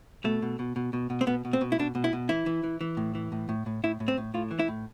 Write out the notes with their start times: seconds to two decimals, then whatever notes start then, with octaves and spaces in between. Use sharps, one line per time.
0.24 B2 A3
0.42 B2
0.59 B2
0.76 B2
0.93 B2
1.10 B2
1.21 C4
1.27 B2 B3
1.45 B2
1.53 C4
1.61 B2
1.72 E4
1.79 B2 D4
1.95 B2
2.04 E4
2.13 B2
2.29 E3 E4
2.46 E3
2.63 E3
2.81 E3
2.97 A2
3.15 E3
3.32 A2
3.49 A2
3.66 A2
3.83 A2 E4
4.00 A2
4.08 C4
4.18 A2
4.34 A2 F4
4.51 E3
4.59 E4
4.68 A2